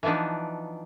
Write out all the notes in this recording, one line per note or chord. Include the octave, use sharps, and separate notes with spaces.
E3 F3 B3 D4 D#4